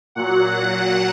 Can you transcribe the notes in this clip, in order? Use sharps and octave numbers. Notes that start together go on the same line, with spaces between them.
A#2 F#3 F#5